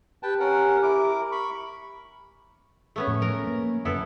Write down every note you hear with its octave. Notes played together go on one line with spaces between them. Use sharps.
G4 B4 G5 A5
C#4 A#4 F#5
E4 A#4 D6
B5 C#6
A3 B3 C#4
A2 F3
A#4
A3 A#3
F#1 F#2 B3 E4 A4